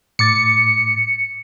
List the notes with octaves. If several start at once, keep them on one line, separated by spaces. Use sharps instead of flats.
A2 D6 A6 C#7